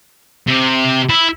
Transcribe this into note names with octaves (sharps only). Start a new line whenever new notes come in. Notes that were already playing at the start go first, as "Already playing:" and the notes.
C3
E4